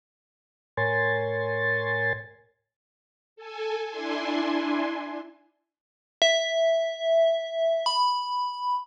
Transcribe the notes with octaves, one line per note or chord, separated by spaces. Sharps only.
A2 A#4 C#5 G#5 C6 A6
A4 G#5
D4 E4 G#5 C6
E5
B5